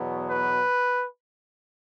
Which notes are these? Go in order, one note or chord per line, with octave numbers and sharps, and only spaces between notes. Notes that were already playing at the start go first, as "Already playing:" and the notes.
Already playing: E2 B2 F#3 B3
B4